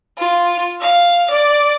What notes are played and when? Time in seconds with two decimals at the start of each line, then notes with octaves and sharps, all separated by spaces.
0.18 F4
0.81 F5
1.29 D5